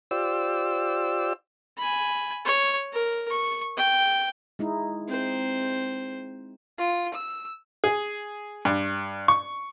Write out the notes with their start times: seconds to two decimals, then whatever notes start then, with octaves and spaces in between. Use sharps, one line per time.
0.11 F4 G4 C5 D5 E6
1.78 G#5 B5
2.45 C#5
2.93 A#4
3.30 C#6
3.77 G5
4.59 G#3 D#4 E4
5.08 C4 C5
6.78 F4
7.14 E6
7.84 G#4
8.65 G2
9.28 C#6